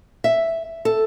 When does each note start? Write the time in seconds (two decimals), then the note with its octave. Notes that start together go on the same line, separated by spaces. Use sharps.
0.24 E5
0.85 A4